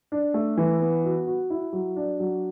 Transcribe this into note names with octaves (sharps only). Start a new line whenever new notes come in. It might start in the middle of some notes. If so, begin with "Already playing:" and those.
D4
A3
E3
B3
F#4
F#4
E4
F#3
D4
F#3